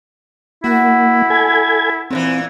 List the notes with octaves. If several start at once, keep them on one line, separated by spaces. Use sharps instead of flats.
A#3 E4 F#4
A4 G#5 G#6
A#2 C#3 E3 C4